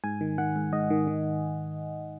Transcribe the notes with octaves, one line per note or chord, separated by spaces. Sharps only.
G#2 G#5
D#3
D#3 F#5
G#2
G#2 D#5
D#3
D#3